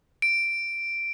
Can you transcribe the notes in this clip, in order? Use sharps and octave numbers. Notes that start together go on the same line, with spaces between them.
D7